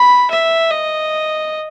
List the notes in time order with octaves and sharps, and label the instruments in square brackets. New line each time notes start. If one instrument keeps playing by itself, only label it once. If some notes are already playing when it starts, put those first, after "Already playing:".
Already playing: [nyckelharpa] B5
E5
D#5